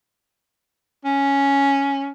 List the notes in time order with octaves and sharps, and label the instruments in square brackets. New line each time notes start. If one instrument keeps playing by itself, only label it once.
[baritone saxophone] C#4